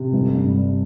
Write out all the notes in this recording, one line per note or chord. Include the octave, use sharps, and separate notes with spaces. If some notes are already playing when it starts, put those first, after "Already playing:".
Already playing: C3
G1
G2
G3